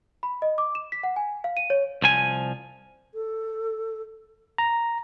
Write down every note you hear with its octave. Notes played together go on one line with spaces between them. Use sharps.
B5
D#5
D6
E7
B6
F#5
G#5
F5
D#7
C#5
C2 F3 G#5
A4
A#5